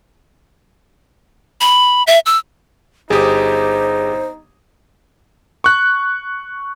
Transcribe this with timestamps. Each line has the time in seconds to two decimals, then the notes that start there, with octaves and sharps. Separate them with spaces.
1.61 B5
2.07 E5
2.26 E6
3.10 G1 D#4 G4 G#4 C5 D#6
5.64 C#6 F#6